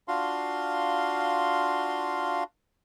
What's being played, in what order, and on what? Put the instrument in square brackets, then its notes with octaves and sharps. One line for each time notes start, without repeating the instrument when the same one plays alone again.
[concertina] D4 F4 F#4 F5 C6